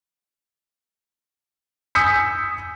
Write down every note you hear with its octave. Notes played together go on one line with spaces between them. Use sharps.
G#5 D#6 E6 G6 B6 C#7